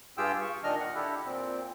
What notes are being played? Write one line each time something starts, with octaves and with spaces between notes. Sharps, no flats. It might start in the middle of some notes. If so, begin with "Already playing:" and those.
G2 F4 G4 G#4 G5 E6
C#6
A#2 D#3 D4 D#5 F6
F#5
D4 E4 G4 A4
A#2 C4